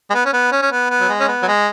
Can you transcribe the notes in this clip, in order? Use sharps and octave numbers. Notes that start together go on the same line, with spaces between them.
G#3
B3
C#4
B3
C#4
C#4
B3
B3
F#3
G#3
C#4
B3
F#3
G#3